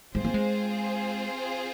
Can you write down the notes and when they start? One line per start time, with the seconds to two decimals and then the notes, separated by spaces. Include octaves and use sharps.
0.15 G#3 C4 F4 G#4 C5
0.25 A#3
0.34 G#3